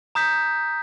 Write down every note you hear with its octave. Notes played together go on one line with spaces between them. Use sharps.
A#5 D#6 G6 B6